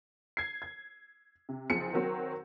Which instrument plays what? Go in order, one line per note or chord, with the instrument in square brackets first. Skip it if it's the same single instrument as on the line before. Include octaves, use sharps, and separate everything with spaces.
[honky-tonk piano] G#6 C7
G#6
C3
F#1 F3 C4 G#4 C#7
D#3 F#3 C4